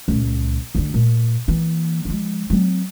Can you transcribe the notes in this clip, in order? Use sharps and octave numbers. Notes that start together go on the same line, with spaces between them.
C#2 A#2
D2 D3
A#2
E3 A#3
F3 G#3
F#3 C4